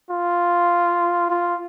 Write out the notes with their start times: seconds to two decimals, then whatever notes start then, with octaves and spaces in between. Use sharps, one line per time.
0.11 F4
1.30 F4